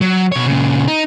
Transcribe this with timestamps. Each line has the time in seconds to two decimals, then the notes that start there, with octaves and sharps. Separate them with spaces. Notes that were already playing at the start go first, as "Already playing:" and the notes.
0.01 F#3
0.32 B2 C#5
0.46 A#2 C#3
0.87 D#4